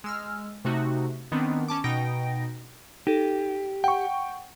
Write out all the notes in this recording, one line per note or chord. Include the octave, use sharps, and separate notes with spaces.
G#3 E6 F6
C3 A3 D#4 F#4
D#3 B3 C4 D4
C#4 A5 D6
B2 D#4 G5 A#6 D7
D#4 G4 A4
F#5 G5 C#6